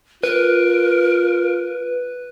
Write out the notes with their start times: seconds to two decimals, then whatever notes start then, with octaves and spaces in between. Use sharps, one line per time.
0.23 F4 A#4 B4